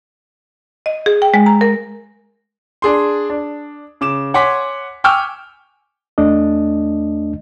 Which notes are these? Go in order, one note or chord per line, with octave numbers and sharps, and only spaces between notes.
D#5
G#4
G5
G#3
A#5
A#4
D4 G#4 C6
D4
C#3 D6 E7
C#5 F#5 G#5 C6 D6 B6
G5 G#5 C#6 D6 E6 F6
E2 A3 D4 D#5